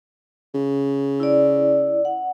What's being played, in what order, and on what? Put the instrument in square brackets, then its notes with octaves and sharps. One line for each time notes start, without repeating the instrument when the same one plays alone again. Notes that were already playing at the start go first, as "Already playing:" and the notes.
[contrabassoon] C#3
[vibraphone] E4 D5
F#5